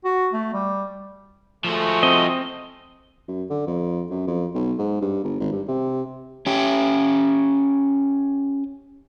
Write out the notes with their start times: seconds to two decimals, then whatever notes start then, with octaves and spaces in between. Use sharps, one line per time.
0.04 F#4
0.33 A3
0.53 G3
1.64 F3 G#3 A3 F#4
2.03 C4 D#5
3.28 F#2
3.50 D3
3.67 F2
4.10 F#2
4.27 F2
4.54 B1
4.79 G#2
5.01 G2
5.24 G1
5.40 G#1
5.52 G2
5.68 C3
6.46 C#4 G4